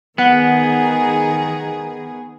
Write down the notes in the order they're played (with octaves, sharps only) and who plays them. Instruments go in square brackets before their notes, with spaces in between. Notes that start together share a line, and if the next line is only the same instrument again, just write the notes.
[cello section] D#3 G#4 [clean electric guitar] B3 [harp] F#5